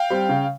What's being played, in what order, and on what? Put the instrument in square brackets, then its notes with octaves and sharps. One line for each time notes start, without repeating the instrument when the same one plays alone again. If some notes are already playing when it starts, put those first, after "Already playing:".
Already playing: [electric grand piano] F5 G5
[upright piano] G3 C4
C#3